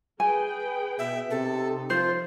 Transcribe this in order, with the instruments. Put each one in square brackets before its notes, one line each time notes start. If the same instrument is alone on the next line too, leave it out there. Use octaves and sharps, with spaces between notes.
[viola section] G#4 B4 G5 [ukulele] G#5
[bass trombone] B2 [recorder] E5
[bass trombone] C3 [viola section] D#4 [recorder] A4
[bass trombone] F3 [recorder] F4 [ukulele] C5